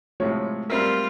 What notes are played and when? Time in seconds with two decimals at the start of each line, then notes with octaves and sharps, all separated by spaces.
0.20 A2 C3 F3 G#3 A3 C#5
0.70 G3 C4 F4 A#4 E5